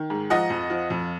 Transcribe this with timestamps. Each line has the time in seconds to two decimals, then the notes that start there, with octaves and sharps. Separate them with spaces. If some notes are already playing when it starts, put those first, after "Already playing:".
Already playing: D#3
0.10 G#2
0.30 F3 D#5 F#5
0.50 F2
0.70 F3
0.90 F2